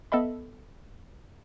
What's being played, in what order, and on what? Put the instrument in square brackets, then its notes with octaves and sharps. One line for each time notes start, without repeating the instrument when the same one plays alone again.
[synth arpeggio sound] B3 A4 D#5 E5 B5